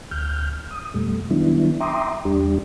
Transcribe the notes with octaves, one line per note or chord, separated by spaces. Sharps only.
D2 F6 G6
D#6
F2 B2 G3 A3
D#3 F#3 G3 B3 D4 E4
E5 G5 A#5 C6 D6 D#6
E2 G3 D4 G4